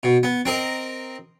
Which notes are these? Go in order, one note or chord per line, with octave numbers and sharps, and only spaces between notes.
B2
B3
C4 A#4 D#5